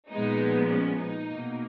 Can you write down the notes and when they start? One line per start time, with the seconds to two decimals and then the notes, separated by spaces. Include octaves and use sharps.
0.11 A#2 F3 G#3 B3 D#4
0.69 C#4
0.97 D#4
1.26 B2 A#3